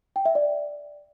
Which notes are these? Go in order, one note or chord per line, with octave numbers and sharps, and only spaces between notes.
G5
E5
D5